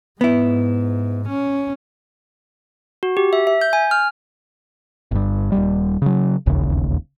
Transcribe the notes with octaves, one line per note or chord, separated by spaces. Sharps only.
G#2 B3 E4
C#4
F#4
G4
E5
E5
G6
G#5
F6
G1 G2
D#1 A#1 G3
C#3 F#3
E1 A#1 D#2 C#3